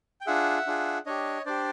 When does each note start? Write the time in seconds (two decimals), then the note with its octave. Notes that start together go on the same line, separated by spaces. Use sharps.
0.21 G5
0.27 D4 F4 G#4 E5 F#5
0.67 D4 F4 G#4
1.06 D4 G4 C#5 D#5
1.46 D4 G4 C5 D5